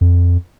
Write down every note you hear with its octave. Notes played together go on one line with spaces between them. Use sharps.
F2